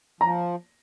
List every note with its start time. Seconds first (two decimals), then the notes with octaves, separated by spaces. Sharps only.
0.21 F3 A#5